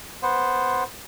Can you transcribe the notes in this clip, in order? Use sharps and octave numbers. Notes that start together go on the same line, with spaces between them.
B3 C5